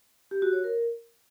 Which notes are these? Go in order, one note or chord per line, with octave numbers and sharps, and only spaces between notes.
G4
F#4
C#5
A#4